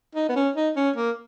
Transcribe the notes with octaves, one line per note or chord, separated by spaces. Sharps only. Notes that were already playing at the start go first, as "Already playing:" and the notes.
D#4
B3
C#4
D#4
C#4
A#3